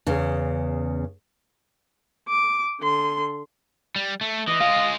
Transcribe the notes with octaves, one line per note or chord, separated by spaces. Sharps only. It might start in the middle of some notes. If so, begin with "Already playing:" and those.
E2 C#3
D6
D3 C6
G3
A3
E3 E4 D#5 E5
G#3 F4 F5